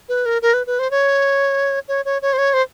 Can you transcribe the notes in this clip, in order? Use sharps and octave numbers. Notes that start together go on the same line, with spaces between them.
B4
A#4
A#4
B4
B4
C5
C#5
C#5
C#5
C#5
C5
C#5
C5